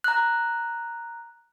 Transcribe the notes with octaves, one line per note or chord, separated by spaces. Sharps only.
A#5 F#6